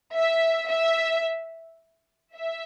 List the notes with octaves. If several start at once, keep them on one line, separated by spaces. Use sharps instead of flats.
E5
E5
E5